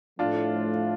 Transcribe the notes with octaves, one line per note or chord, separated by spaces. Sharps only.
A2 F3 A3 D4 F4